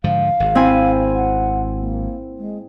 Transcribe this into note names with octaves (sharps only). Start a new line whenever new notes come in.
G#2 D3 F3 F5
G#1
C4 E4 G#5
F#5
A#3
G#3